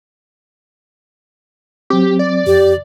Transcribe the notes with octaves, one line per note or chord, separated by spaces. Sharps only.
F#3 C4 G4
D5
F2 G4